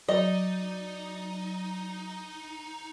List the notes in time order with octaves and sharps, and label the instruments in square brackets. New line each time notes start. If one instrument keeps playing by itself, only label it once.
[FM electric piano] F#3 [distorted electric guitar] D#4 [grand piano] D5 [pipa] D#5